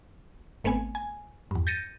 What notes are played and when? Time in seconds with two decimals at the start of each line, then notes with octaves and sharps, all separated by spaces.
0.64 G#1 A3 B3 C4 G#5
0.95 G#5
1.51 E2 G2
1.67 G6 A6 A#6 C#7 D#7